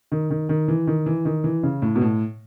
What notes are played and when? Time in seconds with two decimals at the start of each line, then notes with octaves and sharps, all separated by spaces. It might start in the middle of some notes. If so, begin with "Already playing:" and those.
0.12 D#3
0.31 D#3
0.49 D#3
0.68 E3
0.87 D#3
1.06 E3
1.25 D#3
1.44 E3
1.63 C#3
1.82 A2
1.95 B2
2.01 A2